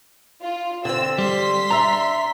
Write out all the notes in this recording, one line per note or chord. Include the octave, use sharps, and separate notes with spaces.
F4
D3 C4 E6
G3 C6 B6
D4 E5 A#5